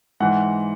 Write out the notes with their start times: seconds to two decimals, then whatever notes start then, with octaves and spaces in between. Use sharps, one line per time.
0.20 G#2 E3 F#5